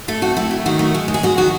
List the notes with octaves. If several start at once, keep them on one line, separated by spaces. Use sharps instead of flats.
A3 A4
C4 F#4
A3 E4
A3
D#3 F#4
A3
G#3
G#3
G#4
G#3 F#4
D#3 F#4